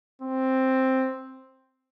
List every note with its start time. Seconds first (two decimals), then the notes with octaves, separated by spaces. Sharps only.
0.21 C4